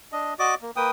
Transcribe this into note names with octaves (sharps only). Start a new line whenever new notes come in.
D4 D#5
F#4 D5 D#5 D6
A#3
A#3 B4 G5 D#6